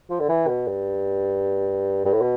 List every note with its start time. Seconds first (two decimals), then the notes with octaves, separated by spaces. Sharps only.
0.10 F3
0.20 D3
0.29 E3
0.47 B2
0.68 G2
2.05 G2
2.13 A2
2.21 B2